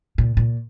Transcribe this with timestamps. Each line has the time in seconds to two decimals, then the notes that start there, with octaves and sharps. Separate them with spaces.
0.18 A#2
0.37 A#2